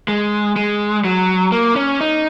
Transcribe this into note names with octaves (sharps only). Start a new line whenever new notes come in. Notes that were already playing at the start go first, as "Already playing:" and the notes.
G#3
G#3
F#3
A#3
C#4
D#4